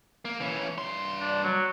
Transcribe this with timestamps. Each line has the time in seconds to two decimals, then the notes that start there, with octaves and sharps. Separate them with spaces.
0.25 A#3
0.40 E3 C#4
0.78 G2 C6
1.21 D4
1.44 F#3